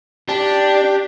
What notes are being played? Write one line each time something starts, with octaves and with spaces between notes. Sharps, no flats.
D4 G4